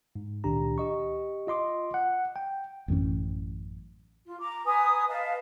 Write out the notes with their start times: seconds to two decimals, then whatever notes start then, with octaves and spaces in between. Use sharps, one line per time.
0.15 G#2
0.44 C#2 A#2 D#3 D4 G4 A#5
0.78 G4 D#5 C#6
1.47 F4 D#5 C6 D6
1.94 F#5
2.36 G5
2.88 A1 F#2 E3 C#4
4.26 F4
4.39 A#5 D6
4.65 B4 G#5 A#5 D#6
5.08 B4 D#5 F5 A5